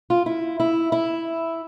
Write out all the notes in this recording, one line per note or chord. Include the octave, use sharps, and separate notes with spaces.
F4
E4
E4
E4